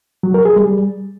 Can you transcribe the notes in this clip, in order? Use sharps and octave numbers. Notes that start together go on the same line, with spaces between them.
F#3
A#4
G#4
G3